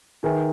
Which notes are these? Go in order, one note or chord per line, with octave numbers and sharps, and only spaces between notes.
D#3 D#4 G#4 B4 E5 G#5